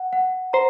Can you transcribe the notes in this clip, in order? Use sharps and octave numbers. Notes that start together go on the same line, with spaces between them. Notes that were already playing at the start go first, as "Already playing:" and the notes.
Already playing: F#5
F#5
C5 A#5